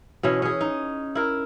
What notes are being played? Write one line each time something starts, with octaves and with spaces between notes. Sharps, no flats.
B2 E3 C#4
C#4 G#4
D#4
E4 A#4